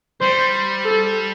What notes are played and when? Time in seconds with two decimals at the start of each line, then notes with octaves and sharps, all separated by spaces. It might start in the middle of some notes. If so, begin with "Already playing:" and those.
0.21 G3 C5
0.85 A4